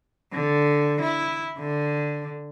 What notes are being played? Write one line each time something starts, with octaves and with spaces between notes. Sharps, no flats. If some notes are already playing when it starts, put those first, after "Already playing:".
D3
E4
D3